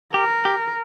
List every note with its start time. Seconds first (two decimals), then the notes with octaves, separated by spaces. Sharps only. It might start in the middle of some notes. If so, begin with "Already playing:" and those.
0.14 G4 A#4
0.45 G4